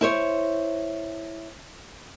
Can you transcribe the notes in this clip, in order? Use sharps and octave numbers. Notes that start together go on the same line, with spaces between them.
E4 C5 C#5